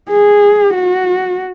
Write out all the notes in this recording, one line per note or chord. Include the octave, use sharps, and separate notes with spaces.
G#4
F#4